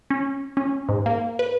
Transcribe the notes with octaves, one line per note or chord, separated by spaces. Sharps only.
C#4
C#4
G#2
A#3
B4